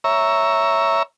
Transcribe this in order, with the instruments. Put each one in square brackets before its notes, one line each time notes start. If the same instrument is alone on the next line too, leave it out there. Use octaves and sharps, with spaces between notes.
[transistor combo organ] C#5 E5 A#5